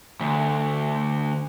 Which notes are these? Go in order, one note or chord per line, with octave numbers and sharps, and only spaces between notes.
D2